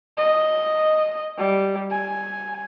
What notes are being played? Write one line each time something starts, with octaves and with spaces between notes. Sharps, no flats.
D#5
G3
G#5